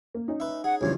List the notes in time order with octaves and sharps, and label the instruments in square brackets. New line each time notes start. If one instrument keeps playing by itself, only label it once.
[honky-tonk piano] A#3
C#4 D#4
[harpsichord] B4 E5
[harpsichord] G#4 [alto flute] F#5
[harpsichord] B1 G2 F3 [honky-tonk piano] C#3 E3 [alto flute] C#5